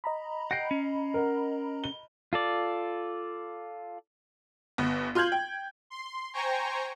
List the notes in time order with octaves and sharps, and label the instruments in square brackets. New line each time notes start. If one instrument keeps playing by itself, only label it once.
[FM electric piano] D#5 A#5 B5
[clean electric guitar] F#5 G5 [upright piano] A#6 C7
[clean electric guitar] C#4
[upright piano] A#4 F#5
G7
[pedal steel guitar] F4 A4 D5
[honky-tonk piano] G1 B3
F4 C6 F6 G6 G#6 F#7
G5
[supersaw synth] C6
C5 G5 G#5 A#5 C#6